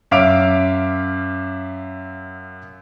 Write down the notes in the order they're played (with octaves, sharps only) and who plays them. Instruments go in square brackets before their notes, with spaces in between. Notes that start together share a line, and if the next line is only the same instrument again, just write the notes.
[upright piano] F#2 E5 F5 D6 D7 F7